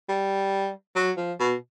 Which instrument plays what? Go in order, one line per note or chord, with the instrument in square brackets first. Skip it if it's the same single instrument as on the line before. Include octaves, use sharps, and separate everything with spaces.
[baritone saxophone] G3
F#3
F3
B2